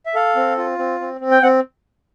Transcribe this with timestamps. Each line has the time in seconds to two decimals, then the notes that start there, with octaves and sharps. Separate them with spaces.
0.06 E5
0.15 A4 F5
0.36 C4
0.58 F4
0.79 C4
1.00 C4
1.21 C4
1.31 G5
1.42 C4 F#5